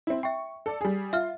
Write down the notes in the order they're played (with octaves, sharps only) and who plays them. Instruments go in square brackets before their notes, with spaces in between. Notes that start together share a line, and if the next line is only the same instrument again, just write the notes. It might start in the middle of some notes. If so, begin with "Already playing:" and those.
[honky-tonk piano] C4 E4
[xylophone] E5 G5 [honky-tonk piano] C#6
[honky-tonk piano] A4 D5
G3 G#4
[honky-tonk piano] F4 [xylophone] E5 F6